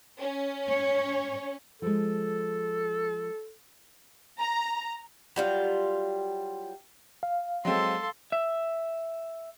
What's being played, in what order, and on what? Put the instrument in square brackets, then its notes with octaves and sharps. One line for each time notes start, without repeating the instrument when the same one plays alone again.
[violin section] C#4
[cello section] C#5
[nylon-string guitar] F3 G#3 [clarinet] A4
[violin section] A#5
[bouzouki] F#3 G3 F4
[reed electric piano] F5
[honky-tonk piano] F#3 G#3 C4 [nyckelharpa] A4 C6
[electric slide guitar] E5